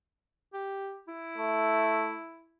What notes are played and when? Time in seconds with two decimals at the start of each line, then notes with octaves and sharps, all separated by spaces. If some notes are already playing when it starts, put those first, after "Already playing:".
0.53 G4
1.08 E4
1.38 A3